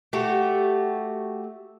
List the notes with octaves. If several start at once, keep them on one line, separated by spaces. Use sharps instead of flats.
A3 F#4 G4